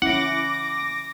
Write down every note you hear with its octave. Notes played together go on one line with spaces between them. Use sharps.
C#4 E4 F#5 D6 A#6